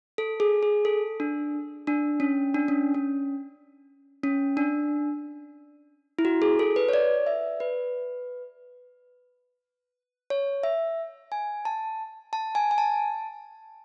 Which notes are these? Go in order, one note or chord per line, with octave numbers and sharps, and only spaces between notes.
A4
G#4
G#4
A4
D4
D4
C#4
D4
C#4
C#4
C#4
D4
E4
F#4
G#4
A4
B4
C#5
D5
E5
B4
C#5
E5
G#5
A5
A5
G#5
G#5
A5